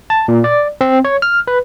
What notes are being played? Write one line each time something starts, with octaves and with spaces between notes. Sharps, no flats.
A5
A#2
D5
C4
C#5
F6
B4